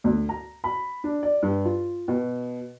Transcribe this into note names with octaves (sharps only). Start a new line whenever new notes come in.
D2
A#5
B5
D4
D5
G2
F4
B2